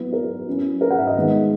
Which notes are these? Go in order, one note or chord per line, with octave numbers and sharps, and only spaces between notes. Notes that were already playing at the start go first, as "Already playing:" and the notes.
Already playing: F#3 B3 E4
A#4
F#3 C#4 E4
A#4
F#5
E5
D#5
D#3 G#3 B3 D#4